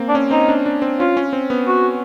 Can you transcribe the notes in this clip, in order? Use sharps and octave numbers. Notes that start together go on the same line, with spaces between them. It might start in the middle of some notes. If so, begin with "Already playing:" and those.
Already playing: A#3 C4
D4
C#4
C4 D#4
D4
D4
C4
C#4 F4
C#4
C4
B3
F#4